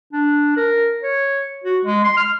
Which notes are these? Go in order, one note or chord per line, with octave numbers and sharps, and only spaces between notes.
D4
A#4
C#5
F#4
G#3
C6
F6